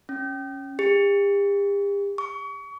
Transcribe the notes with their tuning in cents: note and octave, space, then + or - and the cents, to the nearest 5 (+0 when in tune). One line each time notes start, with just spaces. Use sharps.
C#4 -5
G4 +40
C#6 +35